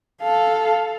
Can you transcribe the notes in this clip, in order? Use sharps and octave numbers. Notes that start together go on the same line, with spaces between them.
A4 F5